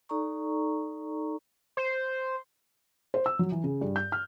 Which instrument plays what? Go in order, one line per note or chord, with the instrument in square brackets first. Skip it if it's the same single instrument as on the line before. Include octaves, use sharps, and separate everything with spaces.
[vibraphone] D#4 A4 D5 A#5 C#6
[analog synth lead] C5
[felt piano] C5
E6
F#3
E3
C#3
G2
G6
F6